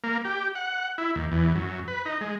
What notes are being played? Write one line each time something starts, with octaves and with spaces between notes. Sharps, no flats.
A#3
G4
F#5
E4
D#2
E2
F#2
B4
D#4
G#3